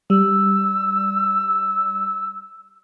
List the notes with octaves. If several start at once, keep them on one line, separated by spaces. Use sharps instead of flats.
G3 E6